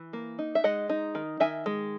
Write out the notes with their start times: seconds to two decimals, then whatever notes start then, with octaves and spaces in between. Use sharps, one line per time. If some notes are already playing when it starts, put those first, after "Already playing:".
Already playing: E3
0.13 A#3
0.39 D#4
0.55 E5
0.64 G#3 D#5 F#5
0.90 D#4
1.15 D#3
1.40 D#3 E5 G#5
1.66 G#3